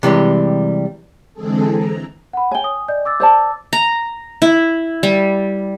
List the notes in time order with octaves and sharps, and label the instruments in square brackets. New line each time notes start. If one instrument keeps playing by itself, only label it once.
[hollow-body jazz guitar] C3 E3 G3 G#3
[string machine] D3 E3 G#3 C4 G#4 A4
A#5
[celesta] F#5 B5
[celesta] C#5 G7 [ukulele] G5 G#5
[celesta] D#6
D5 D#5 G6
D6 E6 A6
[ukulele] C5 D5 A5
[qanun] A#5
E4
G3